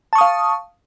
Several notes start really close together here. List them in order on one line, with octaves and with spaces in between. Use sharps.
A5 C#6 D#6 F5